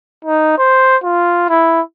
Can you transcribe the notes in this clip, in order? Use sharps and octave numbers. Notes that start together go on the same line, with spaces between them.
D#4
C5
F4
E4